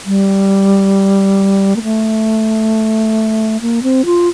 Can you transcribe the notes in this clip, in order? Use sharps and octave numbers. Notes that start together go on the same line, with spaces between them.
G3
A#3
A3
A#3
C4
F4